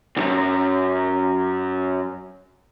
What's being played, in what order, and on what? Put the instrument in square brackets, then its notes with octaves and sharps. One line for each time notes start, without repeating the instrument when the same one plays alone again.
[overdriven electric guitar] C2 F#2